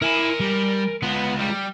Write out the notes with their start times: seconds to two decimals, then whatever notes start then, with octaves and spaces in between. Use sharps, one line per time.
0.02 E4 A#4 G#5
0.40 G3
1.03 G#3 B3 F4
1.40 G3